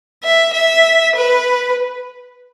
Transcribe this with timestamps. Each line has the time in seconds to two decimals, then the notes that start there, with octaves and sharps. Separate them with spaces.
0.24 E5
0.54 E5
1.16 B4